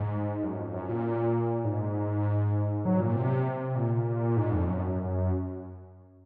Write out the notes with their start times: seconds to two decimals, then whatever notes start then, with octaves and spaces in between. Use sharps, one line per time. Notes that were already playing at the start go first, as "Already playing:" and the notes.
Already playing: G#2
0.43 F#2
0.58 F2
0.74 F#2
0.89 A#2
1.65 G#2
2.85 F#3
3.00 A#2
3.16 C3
3.75 A#2
4.37 G#2
4.52 F2
4.67 F#2